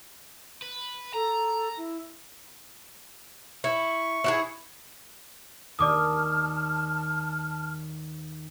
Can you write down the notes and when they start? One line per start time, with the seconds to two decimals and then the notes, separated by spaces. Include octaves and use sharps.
0.62 B4
1.14 A4 A#5
1.77 E4
3.64 E4 C#6
4.24 E4 F#4 G#4
5.79 D#2 D5 A5 D6 D#6 F6